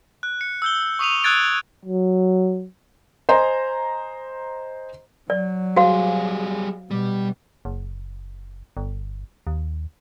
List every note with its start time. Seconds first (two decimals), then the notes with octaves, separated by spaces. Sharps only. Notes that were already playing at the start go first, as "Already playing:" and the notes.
0.23 F#6
0.41 C#7
0.62 E6 G6 G7
0.99 C#6 D#6 D#7 F7
1.24 D#6 E6 F#6 G#6 A6 D7
1.85 F#3
3.29 C5 D#5 G#5 A#5 C6
5.30 F#3 D5
5.76 G3 F#4 G#4 C5 F5
6.91 B2 G3
7.65 F#1
8.77 G1
9.47 D#2